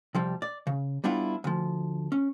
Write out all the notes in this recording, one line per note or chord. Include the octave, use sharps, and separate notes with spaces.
C3 F3 G3
D5
C#3
G3 B3 D4 E4 F4
D2 F3
C#4